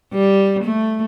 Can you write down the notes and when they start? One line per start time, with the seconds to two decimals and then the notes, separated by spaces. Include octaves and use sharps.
0.14 G3
0.64 A3